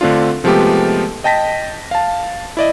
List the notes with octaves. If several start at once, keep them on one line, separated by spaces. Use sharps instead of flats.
D3 A3 C4 D4 F4
C3 F3 G#3 A3 B3 G4
D#5 G5 A5 A#6 B6
F5 A5
E4 D5 D#5